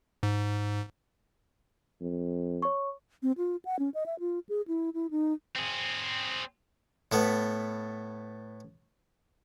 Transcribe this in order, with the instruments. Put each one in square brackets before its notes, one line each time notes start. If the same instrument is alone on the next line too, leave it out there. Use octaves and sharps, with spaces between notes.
[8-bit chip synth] G#2
[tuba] F2
[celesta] C#5 C#6
[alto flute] C4
F4
F#5
C#4
D#5
E5
F4
G#4
E4
E4
D#4
[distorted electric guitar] C4 G#4
[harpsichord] A2 A3 B3